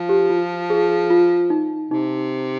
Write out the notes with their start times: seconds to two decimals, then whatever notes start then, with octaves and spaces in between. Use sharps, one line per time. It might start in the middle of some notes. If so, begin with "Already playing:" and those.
Already playing: F3
0.09 G4
0.30 F4
0.70 G#4
1.10 F4
1.50 D#4
1.91 C3 D#4